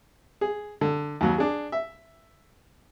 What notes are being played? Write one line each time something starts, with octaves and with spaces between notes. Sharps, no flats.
G#4
D3
D#2 F#3
D4 G#4
E5